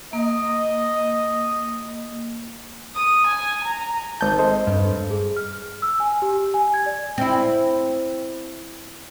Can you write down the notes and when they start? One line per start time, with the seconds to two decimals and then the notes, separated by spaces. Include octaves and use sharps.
0.13 A#3 D#5
2.94 D#6
3.26 G#5
3.63 A#5
4.21 G#1 A5 G6
4.39 A4 C5 D#5
4.67 G2
5.11 G#4
5.37 F6
5.82 E6
6.00 G#5
6.22 G4
6.54 G#5
6.74 G#6
6.86 D5
7.18 C4 E4